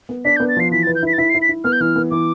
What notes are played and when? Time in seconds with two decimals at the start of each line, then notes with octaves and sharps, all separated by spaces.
0.09 B3
0.25 D4 B6
0.37 G6
0.40 B3
0.49 A6
0.57 F3 C7
0.71 E3 B6
0.83 A6
0.87 B4
0.95 G6
1.03 E4 B6
1.13 A6
1.18 E4 B6
1.30 C7
1.34 E4
1.42 B6
1.49 E4
1.64 B3 F6
1.73 G6
1.80 E3 F6
1.96 B3
2.11 E3 D6